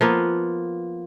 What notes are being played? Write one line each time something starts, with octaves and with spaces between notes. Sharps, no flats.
F3 A#3 B3